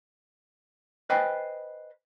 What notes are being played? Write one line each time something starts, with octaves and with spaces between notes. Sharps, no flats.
B4 C5 D#5 G5 G#5 B5